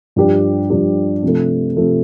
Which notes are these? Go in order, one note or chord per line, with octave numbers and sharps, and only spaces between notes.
G2 F3 D4 G4
G2 F3 D4 G4
C3 F3 A3
C3 F3 A3